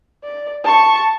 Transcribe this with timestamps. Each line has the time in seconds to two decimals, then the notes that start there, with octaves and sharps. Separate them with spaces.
0.24 D5
0.64 A5 C#6